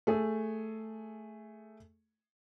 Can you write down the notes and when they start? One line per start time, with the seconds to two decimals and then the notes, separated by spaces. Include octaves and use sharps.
0.07 A3 G#4 A4